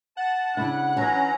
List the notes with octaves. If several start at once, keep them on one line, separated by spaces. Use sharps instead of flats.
F#5 A5
C#3 D4 E4 F#6
E3 F#3 C#4 C#5 A#5